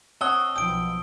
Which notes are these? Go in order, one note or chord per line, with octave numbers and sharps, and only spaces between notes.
C4 C#5 D#5 F#5 A5 E6 G7
B1 F3 B3 G5 D#6 D7